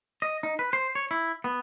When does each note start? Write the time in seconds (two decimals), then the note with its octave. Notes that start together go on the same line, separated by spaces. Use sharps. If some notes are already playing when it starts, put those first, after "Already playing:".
0.22 D#5
0.43 D#4
0.59 B4
0.73 C5
0.95 C#5
1.11 E4
1.44 B3